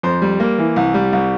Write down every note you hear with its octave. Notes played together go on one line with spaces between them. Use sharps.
F2 C5
G3
A#3
E3
C2
G3
C2